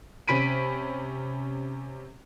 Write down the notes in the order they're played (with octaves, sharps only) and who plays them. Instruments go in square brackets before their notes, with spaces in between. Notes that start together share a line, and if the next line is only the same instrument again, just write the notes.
[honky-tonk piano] C3 C#4 B5 B6 D7 D#7